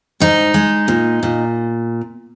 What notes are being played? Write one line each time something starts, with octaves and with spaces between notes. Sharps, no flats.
G#2 D#4
G#3
A#2
A#2